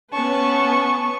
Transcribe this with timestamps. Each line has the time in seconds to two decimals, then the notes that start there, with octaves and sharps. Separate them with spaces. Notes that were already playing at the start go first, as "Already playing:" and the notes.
0.13 B3 C#4 B4 A5 C#6